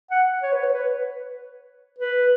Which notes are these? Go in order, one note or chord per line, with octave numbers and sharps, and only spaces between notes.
F#5
C#5
B4
C#5
B4
B4